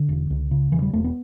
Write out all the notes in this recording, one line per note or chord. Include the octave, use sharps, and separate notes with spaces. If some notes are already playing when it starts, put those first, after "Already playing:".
Already playing: D3
E1
C#2
C#3
E1 E3
G3
E1 A3
B3